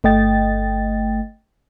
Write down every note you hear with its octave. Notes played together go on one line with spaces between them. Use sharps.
G1 A3 D#5 G5 A6